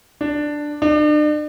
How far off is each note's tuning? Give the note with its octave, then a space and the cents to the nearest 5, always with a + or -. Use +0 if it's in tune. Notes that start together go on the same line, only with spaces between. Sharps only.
D4 +5
D4 +40